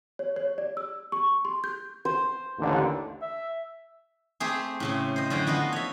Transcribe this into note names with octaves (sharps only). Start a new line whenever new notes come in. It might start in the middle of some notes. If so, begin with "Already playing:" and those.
C#5
C#5
D5
E6
C#6
C6
G6
C5
A1 D#2 D3
E5
A3 C4 G4 G#4
A2 C#3 C4
C5 D#5
F#2 D3 C#4 C5 G5
F3 B3 F4 F#4 D#5
C#5 E5